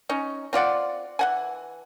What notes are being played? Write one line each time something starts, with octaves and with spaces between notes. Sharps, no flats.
C#4 D#4
C4 F4 D5 F#5
E3 F#5 G#5